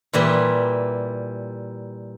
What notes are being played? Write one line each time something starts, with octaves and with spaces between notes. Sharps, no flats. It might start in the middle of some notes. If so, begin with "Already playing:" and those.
A#2 E3 G3